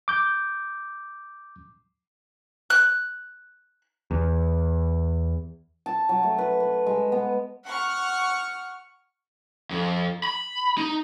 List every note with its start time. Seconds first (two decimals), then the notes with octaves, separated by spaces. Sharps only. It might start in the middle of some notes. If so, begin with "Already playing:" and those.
0.08 D6 G6
2.70 F#6
4.11 E2
5.86 A5
6.09 F#3
6.23 A3
6.38 B4
6.60 B4
6.87 G#3
7.12 B3
7.66 F#5 C#6 F6
9.71 F2
10.23 B5
10.78 D#4